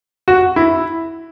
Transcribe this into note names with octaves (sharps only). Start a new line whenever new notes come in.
F#4
E4